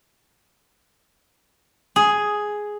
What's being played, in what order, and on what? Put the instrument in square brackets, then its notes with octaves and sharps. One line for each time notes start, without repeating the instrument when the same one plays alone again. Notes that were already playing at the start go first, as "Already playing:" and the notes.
[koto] G#4